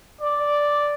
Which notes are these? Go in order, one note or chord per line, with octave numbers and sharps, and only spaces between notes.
D5